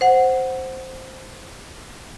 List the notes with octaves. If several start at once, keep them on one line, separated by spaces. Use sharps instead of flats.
C5 F#5